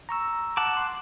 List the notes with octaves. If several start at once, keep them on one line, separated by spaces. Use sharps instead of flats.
A#5 C#6 E6
F#5 A5 D6
C6